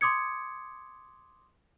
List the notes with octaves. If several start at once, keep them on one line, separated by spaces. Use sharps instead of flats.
C6 D6 D#6 G#6 C#7